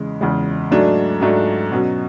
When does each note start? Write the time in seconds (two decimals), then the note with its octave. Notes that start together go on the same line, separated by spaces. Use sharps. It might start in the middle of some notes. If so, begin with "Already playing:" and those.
Already playing: E2 C#3 G#3
0.21 E2 C#3 G#3
0.71 G#2 F#3 A3 D4 F#4
1.21 G#2 F#3 A3 D4 F#4
1.71 B2 F#3 C#4 F#4